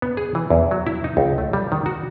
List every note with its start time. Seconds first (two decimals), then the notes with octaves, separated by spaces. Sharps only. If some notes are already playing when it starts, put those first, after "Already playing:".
0.02 B3
0.17 G#4
0.35 E3
0.50 E2
0.71 F#3
0.87 E4
1.04 D#4
1.17 C#2
1.38 A3
1.53 G3
1.72 D#3
1.86 F#4